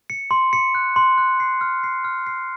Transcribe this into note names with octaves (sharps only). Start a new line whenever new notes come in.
C#7
C6
C#7
F#6
C6
F#6
C7
F6
C7
F6
C7